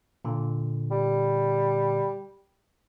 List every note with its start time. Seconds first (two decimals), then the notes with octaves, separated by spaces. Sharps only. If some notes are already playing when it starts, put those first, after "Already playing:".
0.25 A#2 D3
0.91 G3